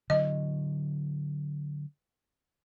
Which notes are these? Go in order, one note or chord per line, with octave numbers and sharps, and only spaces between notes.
D3 F#3 D#5